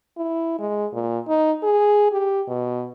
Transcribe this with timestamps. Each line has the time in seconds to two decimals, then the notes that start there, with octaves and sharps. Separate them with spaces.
0.17 E4
0.59 G#3
0.93 A#2
1.28 D#4
1.63 G#4
2.12 G4
2.48 B2